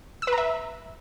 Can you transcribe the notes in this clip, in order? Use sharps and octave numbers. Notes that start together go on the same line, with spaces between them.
E6
B4
A#5
E5